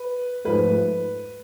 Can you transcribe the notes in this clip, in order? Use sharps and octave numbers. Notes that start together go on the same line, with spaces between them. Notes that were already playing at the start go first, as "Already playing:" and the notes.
Already playing: B4
G#2 F3 A3 B4